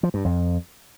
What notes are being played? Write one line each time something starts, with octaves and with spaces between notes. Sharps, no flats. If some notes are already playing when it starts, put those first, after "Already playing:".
F3
G2
F2